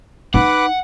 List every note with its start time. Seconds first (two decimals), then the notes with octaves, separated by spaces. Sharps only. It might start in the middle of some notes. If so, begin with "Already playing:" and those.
0.34 D#4 B4 F#5 D6